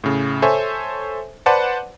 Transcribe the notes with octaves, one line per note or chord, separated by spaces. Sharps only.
A2 C#3
A4 C5 C#5 E5 G#5
B4 C5 D5 F#5 A5